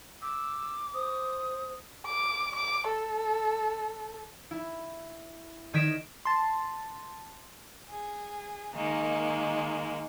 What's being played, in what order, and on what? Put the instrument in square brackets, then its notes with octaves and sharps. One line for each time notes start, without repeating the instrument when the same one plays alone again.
[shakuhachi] D6 [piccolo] E6
[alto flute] C5 [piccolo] D#6
[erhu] D6
D6
A4
[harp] E4
D#3 D#5 G#6 B6 D7 E7
[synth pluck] A5 C6
[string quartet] G#4
D#3 G#3 A#3